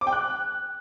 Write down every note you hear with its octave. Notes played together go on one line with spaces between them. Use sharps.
D6
G5
F#6